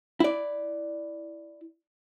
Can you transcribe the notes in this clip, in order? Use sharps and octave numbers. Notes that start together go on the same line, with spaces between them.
E4 D5